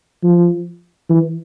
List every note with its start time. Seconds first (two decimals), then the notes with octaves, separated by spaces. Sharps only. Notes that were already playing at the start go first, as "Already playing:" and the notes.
0.23 F3
1.10 E3